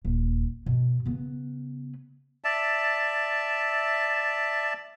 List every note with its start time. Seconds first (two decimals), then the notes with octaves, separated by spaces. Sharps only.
0.05 D#1
0.66 B2
1.06 C#3 B3
2.44 D5 E5 A5